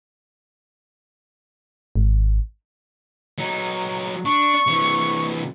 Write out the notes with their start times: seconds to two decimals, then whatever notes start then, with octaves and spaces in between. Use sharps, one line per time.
1.96 G#1
3.38 F#3 D#4
4.25 D4 C#6
4.67 C3 E3